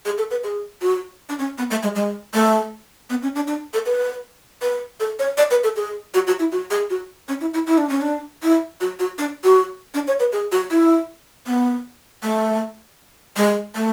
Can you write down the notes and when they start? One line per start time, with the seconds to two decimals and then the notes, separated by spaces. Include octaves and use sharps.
0.06 G#4
0.18 A4
0.31 B4
0.44 G#4
0.82 F#4
1.29 D4
1.39 C#4
1.58 B3
1.71 A3
1.83 G#3
1.95 G#3
2.34 A3
3.10 B3
3.23 C#4
3.35 D4
3.47 D4
3.74 A4
3.86 B4
4.62 B4
5.00 A4
5.19 C#5
5.38 D5
5.51 B4
5.64 A4
5.76 G#4
6.14 F#4
6.27 F#4
6.40 E4
6.52 F#4
6.71 G#4
6.90 F#4
7.28 C#4
7.41 E4
7.54 E4
7.67 E4
7.78 D4
7.89 C#4
8.01 D4
8.43 E4
8.81 F#4
8.99 F#4
9.18 D4
9.44 F#4
9.94 D4
10.08 C#5
10.20 B4
10.33 G#4
10.52 F#4
10.71 E4
11.47 B3
12.23 A3
13.37 G#3
13.75 A3